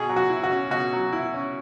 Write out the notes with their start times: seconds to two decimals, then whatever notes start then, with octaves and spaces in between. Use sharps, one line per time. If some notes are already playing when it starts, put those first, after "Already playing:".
Already playing: B2 G#4
0.09 F#3
0.16 F#4
0.30 E4
0.43 F#4
0.51 C#4
0.71 B2 F#4
0.93 F#3
1.13 E4
1.34 C#4